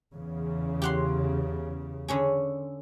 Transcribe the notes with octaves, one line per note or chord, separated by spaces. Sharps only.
E2 C#3
G4 F#5 C6
D3 C#4 G#4